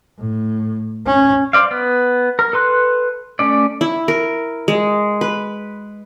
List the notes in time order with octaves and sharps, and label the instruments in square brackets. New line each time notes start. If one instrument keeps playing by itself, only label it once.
[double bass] A2
C#4
[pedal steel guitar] C5 D5 F5
B3
A#4
A4 B4 C6 F#6
A3 C#4 D5
[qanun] E4
A#4
G#3
B4